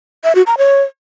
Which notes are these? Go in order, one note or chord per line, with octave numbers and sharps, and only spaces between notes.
E5
F#4
A#5
C#5